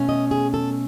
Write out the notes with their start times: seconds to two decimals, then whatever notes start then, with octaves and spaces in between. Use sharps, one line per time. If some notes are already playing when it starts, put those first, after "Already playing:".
Already playing: B2 A3 C#4
0.09 D#5
0.31 G#4
0.54 A4